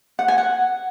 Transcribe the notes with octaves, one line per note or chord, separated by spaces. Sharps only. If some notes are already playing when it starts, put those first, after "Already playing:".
F#5
G#5
F#5